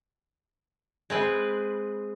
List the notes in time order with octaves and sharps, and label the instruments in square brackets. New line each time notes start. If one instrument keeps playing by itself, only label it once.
[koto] G#3 C4 B4